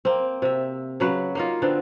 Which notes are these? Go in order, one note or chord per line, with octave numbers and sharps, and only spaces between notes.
A#3 C4
C3 E5
C#3 F#3 B4
A#3 D#4 F4
D3 B3 C4